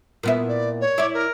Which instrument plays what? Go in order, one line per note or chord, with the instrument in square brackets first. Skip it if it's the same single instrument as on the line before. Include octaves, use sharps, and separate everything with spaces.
[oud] A#2 B3 E4
[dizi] D5
C#5
[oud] E4 D5
[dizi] A#4